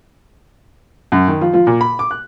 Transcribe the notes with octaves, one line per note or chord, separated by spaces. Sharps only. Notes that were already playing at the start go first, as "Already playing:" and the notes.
F#2
D#3
F3
F3
A#2
B5
D6
F#6